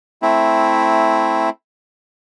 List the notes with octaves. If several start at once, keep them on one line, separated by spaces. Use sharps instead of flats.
A3 C4 E4